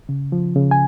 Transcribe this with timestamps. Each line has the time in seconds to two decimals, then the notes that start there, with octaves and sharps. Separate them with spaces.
0.09 C#3
0.32 F3
0.56 C#3
0.71 G#5